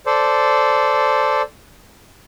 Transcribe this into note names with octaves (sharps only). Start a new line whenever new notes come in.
A4 C5 D5